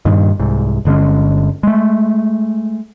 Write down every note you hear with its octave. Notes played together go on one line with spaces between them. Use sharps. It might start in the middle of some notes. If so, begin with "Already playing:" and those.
G2 A#2 D#3
C2 G#2
G1 D3 G#3 C#4
G#3 A3